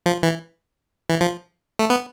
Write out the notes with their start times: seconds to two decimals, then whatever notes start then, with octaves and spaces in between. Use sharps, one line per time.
0.06 F3
0.23 E3
1.09 E3
1.21 F3
1.79 A3
1.90 B3